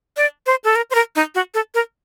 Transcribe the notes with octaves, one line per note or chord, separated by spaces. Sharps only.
D5
C5
A4
A#4
C5
A#4
D#4
F#4
A4
A#4